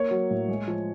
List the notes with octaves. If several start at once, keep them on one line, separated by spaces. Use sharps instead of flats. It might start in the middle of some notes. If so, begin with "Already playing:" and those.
Already playing: A#3 C#5
F#3
A2
G#3
F3